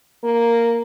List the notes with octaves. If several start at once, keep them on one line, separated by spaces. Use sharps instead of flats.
A#3